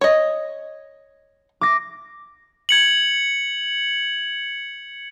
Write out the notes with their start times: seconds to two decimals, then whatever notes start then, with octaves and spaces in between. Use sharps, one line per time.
0.01 C#5 D#5
1.61 D6 A#6
2.69 G#6 C#7 F#7